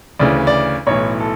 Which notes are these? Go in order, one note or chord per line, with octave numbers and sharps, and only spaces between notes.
D2 C#3 E3 D5
D5
B1 A2 E3 C#5
A4